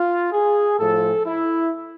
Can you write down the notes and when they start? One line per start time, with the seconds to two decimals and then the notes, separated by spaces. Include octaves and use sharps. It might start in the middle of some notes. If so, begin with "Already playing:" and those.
Already playing: F4
0.33 G#4
0.78 A2 F3 A4
1.26 E4